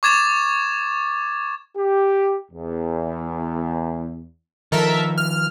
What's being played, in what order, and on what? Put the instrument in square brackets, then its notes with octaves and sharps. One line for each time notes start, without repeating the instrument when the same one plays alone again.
[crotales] C#6 D6 G#6 A6 E7
[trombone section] G4
E2
[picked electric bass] D#3 F3 [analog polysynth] A4 A#4 E5
[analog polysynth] F6